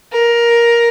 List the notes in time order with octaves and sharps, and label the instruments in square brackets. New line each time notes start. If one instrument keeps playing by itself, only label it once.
[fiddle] A#4